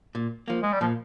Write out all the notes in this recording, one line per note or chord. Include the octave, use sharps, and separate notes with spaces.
A#2
F3 A#3
G#3
G3
A#2 F3